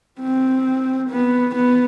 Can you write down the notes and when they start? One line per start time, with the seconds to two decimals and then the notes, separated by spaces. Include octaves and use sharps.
0.21 C4
1.10 B3
1.56 B3